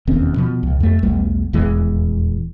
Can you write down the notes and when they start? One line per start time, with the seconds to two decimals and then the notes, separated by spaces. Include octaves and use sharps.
0.07 E1 D#2 C4 C#4
0.36 B2 F3
0.63 C#2
0.80 F2 A3
1.03 B1 E2 G3 A3
1.53 D#1 E2 E3 G#3